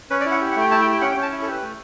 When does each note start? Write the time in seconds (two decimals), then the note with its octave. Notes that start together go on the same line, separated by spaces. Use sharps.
0.10 C#4 B4
0.21 D5
0.26 E4
0.31 F#5
0.42 G4
0.51 F#5
0.56 A3 G5
0.71 E4 A5
0.82 G5
0.87 G4
0.92 G5
1.01 C#4 F#5
1.12 G5
1.17 C#4
1.22 A5
1.32 E4
1.42 A4
1.48 G4 B4
1.62 A3